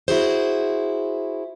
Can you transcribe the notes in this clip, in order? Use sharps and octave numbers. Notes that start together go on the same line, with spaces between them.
E4 F#4 G#4 C5